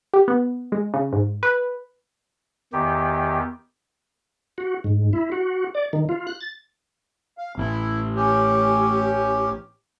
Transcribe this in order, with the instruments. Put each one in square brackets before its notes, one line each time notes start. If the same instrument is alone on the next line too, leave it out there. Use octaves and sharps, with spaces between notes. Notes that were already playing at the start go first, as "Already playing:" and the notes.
[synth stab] G4
B3
G#3
C#3
G#2
B4
[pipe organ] E2 D#3 G4
[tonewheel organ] F#4
G#2
E4
F#4
D5
D#3
F4
F#6
A6
[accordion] F5
[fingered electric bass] A1 [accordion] E4
[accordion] C#4 G4